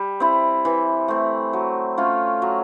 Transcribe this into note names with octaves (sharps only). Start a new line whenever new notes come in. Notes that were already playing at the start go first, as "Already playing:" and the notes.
Already playing: G3
C4 E4
E3
A3 C4
F#3
A3 C#4 F4
F#3